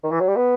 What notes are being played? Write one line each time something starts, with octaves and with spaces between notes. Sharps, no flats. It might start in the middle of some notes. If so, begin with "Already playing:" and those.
D#3
E3
F#3
G3
B3